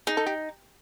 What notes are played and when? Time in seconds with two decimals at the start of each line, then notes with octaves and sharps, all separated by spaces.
0.07 D#4 G#4
0.17 A4
0.26 G4